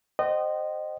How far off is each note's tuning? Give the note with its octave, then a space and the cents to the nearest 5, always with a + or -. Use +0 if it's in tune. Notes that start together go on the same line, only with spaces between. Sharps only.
C5 +0 D#5 -20 G5 -45